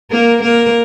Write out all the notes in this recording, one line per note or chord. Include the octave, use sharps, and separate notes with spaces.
A#3 A#4
A#3 A#4